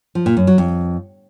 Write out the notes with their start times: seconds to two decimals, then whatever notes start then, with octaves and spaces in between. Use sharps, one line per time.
0.15 F3
0.26 A#2
0.37 F#2
0.47 F#3
0.58 F2